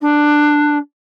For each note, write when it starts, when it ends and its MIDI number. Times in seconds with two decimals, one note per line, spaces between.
0.01 0.77 62